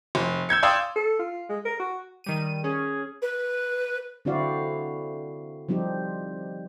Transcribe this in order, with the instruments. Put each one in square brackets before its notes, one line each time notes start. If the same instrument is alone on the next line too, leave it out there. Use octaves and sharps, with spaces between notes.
[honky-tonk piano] F1
E6 G6 G#6 C#7
D5 F5 G5 C6 D#6 E6
[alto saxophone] A4
F4
G#3
A#4
F#4
[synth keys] D#3 G3 D#7
[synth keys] C#4 [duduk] G#4
[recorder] B4
[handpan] D3 C4 E4 F#4 D5 F5
F3 G3 C4 D#4 G4